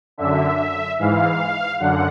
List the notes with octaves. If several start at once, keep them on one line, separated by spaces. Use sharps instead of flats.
F#2 D3 E5
G#2 E3 F5
F#2 D3 F#5